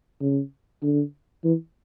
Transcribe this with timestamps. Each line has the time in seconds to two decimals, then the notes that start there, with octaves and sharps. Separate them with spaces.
0.21 C#3
0.83 D3
1.44 E3